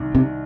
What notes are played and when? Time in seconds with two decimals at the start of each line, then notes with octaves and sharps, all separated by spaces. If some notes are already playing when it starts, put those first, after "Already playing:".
Already playing: C2 D#3
0.15 C3